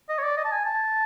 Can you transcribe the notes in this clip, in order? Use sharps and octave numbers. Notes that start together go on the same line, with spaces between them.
D#5
C#5
D5
D#5
A5
G#5
A5